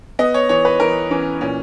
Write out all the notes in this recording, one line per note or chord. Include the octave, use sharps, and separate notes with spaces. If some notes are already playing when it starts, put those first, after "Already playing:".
B3 D#5
C#5
E3 C#5
B4
E3 A#4
E3 C#4
A#2 C#4